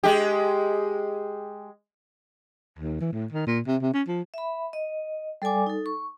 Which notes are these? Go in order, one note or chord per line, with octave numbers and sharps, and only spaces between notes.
G#3 G4
D#2
E3
A2
D#3
A#2
C3
C3
C#4
F3
E5 B5
D#5
G3 A4 D5 G#5 D6
D#4 A4
C#6